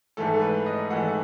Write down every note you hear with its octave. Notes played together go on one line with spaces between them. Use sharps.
G#2 E3 A3 A4
B4
D#5
G#2 E3 A3 F#5